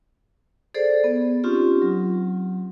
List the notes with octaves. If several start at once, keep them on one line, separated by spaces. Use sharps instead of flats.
G#4 A4 C5 D5
B3
C4 C#4 D#4 F4 G4
F#3